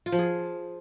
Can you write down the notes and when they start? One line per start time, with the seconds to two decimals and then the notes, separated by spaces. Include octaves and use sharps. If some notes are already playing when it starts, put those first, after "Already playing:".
0.06 F4
0.12 F3
0.19 G#4